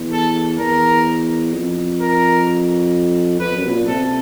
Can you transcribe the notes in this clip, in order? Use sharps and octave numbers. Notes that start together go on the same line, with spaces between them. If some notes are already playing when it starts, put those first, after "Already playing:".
Already playing: E2
A4
E2 A#4
F2
A#4
F2 B4
F#2
B2
A#2
C3 A4